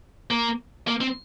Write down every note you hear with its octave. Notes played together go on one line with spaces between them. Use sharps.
A#3
A#3
C4